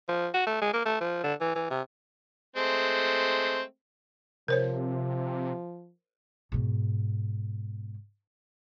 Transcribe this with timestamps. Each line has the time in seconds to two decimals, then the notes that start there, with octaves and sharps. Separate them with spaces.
0.09 F3
0.34 F#4
0.47 A3
0.62 G#3
0.73 A#3
0.85 A3
1.01 F3
1.24 D3
1.41 E3
1.56 E3
1.71 C3
2.56 G#3 A3 C4
4.48 C3 F3 A#4 C5 C#5
6.52 G#2 B2